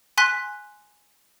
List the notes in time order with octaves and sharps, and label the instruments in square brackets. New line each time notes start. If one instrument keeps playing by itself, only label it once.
[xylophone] G#5 C6 F#6 B6